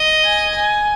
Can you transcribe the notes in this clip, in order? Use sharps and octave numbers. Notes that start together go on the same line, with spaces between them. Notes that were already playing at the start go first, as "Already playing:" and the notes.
Already playing: D#5
G#5
G#5